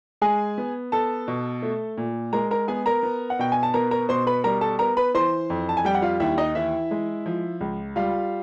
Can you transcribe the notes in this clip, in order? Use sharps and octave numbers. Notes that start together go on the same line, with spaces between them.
G#3 G#4 G#5
B3
B3 A4 A5
B2
A3
A#2
G#3 A#4 A#5
A#4 A#5
B3 G#4 G#5
A#4 A#5
B3
F#5
B2 G5
G#5
A5
B3 A#4 A#5
A#4 A#5
B2 C5 C6
B4 B5
G3 A#4 A#5
A4 A5
B3 A#4 A#5
B4 B5
E3 C5 C6
F2
A5
G#5
G3 G5
F#5
F4 F5
D#2 E4 E5
D#4 D#5
E3 E4 E5
G#3
F3
C#2
G3 F4 F5